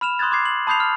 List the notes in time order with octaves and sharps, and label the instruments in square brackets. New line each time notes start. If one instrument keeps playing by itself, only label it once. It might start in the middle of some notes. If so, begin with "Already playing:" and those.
[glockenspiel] B5 F6 E7 F7
C6 D#6 F#6 G#6 A6
C6 D6 G#6 C7
F#7
A5 B5 D#6 G6 C7 F7
F6